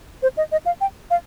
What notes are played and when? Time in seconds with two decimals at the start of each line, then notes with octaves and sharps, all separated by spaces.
0.22 C5
0.37 D#5
0.52 D#5
0.66 F5
0.81 G5
1.11 F5